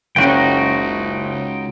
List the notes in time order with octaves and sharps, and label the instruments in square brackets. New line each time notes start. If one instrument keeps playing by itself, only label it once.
[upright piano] F#1 C#4 [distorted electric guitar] C#2 [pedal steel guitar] D#4 F#4 G5